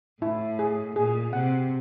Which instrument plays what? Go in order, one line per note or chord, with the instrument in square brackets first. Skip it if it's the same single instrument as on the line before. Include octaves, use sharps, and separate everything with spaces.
[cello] A2 [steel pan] E4
[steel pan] G#4
[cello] A#2 [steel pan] G#4
[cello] C3 [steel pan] F#5